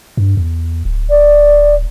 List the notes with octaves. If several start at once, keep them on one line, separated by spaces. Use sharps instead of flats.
G2
E2
D1
D5